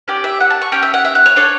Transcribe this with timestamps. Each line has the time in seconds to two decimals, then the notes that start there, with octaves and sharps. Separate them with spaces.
0.08 C#4 G4 D5
0.24 E5
0.40 F#5
0.50 A5
0.61 C#6
0.72 C#4 G4 G5
0.83 E5
0.94 F#5
1.04 E5
1.15 F#5
1.26 C#5
1.36 D4 A4 C#5